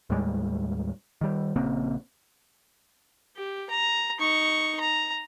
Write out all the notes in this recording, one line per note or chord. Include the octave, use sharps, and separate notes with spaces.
D#2 A2 G3 G#3
D#3 G3
A#1 C#3 A#3 C4
G4
A#5
D#4 C#6
A#5